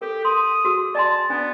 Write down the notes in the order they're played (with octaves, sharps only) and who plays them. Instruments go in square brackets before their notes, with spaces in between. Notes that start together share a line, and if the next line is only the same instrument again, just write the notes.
[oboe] G4 [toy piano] A4 A#4
[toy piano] C6 [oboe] D#6
[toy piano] F#4 G#4 E6
[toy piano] D5 G#5 C6 [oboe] A5
[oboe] B3 [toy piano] D4 G#5